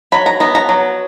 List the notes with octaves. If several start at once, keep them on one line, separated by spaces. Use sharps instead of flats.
F#3 B5
A#5
B3 A#5
A#5
F#3